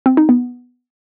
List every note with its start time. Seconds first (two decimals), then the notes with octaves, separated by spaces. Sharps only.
0.06 C4
0.17 D#4
0.29 B3